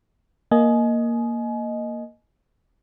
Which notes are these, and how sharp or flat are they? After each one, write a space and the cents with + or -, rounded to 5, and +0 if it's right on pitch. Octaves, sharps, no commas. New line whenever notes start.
A#3 +0 D#5 +0 G#5 +30